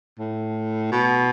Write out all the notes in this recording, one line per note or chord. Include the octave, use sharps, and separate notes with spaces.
A2
B2